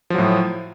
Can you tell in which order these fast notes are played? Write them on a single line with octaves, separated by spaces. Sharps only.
F3 F#3 A2